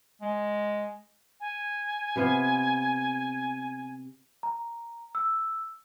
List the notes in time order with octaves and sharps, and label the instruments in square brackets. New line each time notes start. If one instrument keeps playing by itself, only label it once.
[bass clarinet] G#3
[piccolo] G#5
[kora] C3 B3 F4
[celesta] A#5
E6